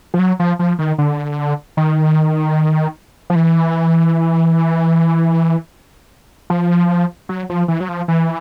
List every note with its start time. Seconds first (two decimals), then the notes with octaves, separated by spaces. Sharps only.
0.14 F3
0.19 F#3
0.40 F3
0.59 F3
0.79 D#3
0.98 D3
1.77 D#3
3.30 F3
3.35 E3
6.50 F3
7.29 F#3
7.50 F3
7.68 E3
7.80 F#3
7.88 F3
8.08 E3